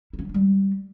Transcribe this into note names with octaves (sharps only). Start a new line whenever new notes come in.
E4
C#4
F#3
D4
G3